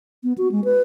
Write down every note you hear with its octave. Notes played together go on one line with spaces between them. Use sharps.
B3
F#4
G#3
B4